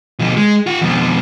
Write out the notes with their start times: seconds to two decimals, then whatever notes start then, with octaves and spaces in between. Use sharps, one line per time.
0.19 B2 F3
0.36 G#3
0.66 F4 F#5
0.82 F2 B2